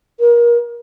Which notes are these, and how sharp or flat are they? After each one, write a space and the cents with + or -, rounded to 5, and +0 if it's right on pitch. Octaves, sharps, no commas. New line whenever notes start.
A#4 +30